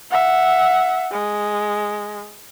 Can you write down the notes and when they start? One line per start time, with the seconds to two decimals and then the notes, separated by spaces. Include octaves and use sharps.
0.11 E5 F#5
1.11 G#3